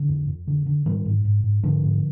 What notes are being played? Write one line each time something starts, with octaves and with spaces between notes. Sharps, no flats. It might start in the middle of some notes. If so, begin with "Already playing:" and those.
Already playing: D3
F2
F2
D3
D3
G#2 D#3 G3
G#2
G#2
G#2
G#2 D3 F3
G#2